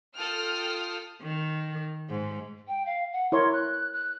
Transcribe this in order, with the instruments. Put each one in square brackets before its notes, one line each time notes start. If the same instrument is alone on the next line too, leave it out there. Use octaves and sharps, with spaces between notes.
[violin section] F4 A4 G5 D#6 F6
[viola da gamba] D#3
G#2
[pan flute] G5
F5
F#5
[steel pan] E4 A#4 C#5 [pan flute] C6
[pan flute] F#6
F#6